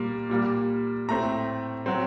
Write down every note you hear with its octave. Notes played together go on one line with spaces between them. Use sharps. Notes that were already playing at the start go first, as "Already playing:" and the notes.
Already playing: A#2 G3 A#3
A#2 G3 A#3
A2 A3 C4 A#5
F#3 C4